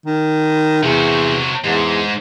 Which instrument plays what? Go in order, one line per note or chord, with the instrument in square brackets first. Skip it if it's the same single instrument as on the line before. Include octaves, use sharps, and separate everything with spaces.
[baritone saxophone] D#3
[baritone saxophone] E2 [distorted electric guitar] C3 F#4
[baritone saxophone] E2 [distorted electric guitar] G#2